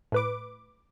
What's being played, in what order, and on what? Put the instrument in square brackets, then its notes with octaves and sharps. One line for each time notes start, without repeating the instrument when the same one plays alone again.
[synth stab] A2 B4 D6